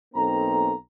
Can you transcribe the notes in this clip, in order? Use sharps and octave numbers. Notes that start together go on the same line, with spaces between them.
B1 A#3 C4 D#4 A4 A#5